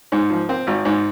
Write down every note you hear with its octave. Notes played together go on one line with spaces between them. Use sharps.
G#2
F3
C4
G#1
G#2